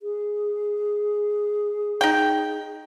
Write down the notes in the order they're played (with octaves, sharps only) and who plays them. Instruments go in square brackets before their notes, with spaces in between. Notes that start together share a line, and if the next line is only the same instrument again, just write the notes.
[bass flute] G#4
[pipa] D#4 G5